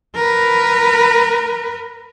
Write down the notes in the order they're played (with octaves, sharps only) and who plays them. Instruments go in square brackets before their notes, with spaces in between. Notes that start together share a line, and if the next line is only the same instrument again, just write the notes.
[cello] A#4 B4